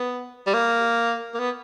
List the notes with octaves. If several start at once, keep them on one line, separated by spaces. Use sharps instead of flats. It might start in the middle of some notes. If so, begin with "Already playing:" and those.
Already playing: B3
G3
A#3
A#3
B3